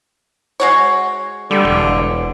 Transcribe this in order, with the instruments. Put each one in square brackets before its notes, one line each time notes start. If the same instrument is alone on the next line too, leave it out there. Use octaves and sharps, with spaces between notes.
[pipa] G#3 F#4 C#5
[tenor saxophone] D3 [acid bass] G3
[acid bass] E1